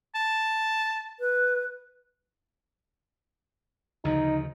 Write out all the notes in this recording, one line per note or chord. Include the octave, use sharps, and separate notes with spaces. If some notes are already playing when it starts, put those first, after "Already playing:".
A5
B4
D2 C#3 F3 D#4